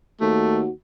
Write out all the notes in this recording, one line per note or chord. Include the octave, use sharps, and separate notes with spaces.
D#2 A3 F#4